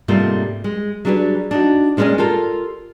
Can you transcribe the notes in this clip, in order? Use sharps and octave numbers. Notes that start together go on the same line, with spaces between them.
G#2 C3 G3 A3 A#3 F4
G#3
F#3 G3 D4 F#4 G#4 B4
D4 D#4 F#4
A#2 G#3 C#4 B4 D5 G#5
F4 G4 A4 A#4